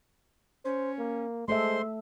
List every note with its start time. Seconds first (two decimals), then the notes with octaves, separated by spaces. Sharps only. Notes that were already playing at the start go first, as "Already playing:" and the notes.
0.65 C#4 C5
0.98 A#3
1.48 G#3 A3 A4 C5 E5 C6